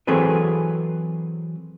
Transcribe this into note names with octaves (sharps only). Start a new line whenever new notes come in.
E3 F#3 C4 G#4 A4 B4